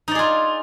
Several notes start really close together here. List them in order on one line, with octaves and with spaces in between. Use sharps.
D#4 D5 G#4 F4